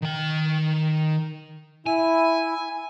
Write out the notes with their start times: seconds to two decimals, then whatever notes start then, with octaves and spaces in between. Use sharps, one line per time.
0.02 D#3 G5
1.86 E4 G#5